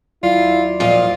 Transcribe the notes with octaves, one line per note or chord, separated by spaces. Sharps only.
D#2 F#3 E4 F4 D5
A#2 F3 F4 D#5